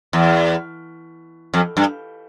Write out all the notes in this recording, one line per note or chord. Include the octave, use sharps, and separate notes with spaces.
E2
F2
G2